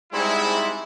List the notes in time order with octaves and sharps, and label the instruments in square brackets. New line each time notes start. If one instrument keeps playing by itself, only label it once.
[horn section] G#2 G3 G#3 C4 E4